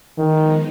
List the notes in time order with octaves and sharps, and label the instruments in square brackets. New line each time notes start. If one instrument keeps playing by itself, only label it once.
[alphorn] D#3 [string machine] F3 G#3 B3 D#4